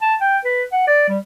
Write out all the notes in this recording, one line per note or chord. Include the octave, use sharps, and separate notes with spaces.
A5
G5
B4
F#5
D5
G3